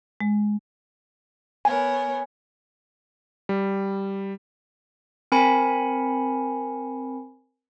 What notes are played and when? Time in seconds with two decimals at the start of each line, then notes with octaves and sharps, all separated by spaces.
0.20 G#3
1.65 B3 A#4 C#5 G#5
3.49 G3
5.32 C4 A#4 G#5 B5 C#7